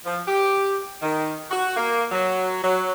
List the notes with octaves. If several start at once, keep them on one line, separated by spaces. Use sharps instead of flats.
F3
G4
D#3
F#4
A#3
F#3
F#3